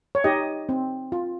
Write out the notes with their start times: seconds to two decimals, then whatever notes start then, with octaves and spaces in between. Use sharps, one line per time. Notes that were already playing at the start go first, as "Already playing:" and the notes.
0.15 C#5
0.24 D#4 G4 D#5
0.69 C4
1.12 F4